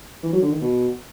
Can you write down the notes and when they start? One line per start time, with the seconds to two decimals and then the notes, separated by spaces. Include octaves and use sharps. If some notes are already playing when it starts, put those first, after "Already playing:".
0.23 E3
0.33 F#3
0.42 D3
0.52 D#3
0.62 B2